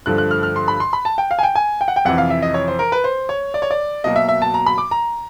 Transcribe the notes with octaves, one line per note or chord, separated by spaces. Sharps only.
G2 D3 F3 A3 F#6
F#6
F6
F6
C6
B5
C6
B5
A5
G5
F5
G#5
G5
G#5
G5
F#5
G5
F2 C3 E3 F#5
F5
E5
D#5
C#5
C5
A#4
B4
C5
C#5
D5
C#5
D5
B2 F#3 A#3 D#5
E5
E5
A5
A#5
B5
D6
A#5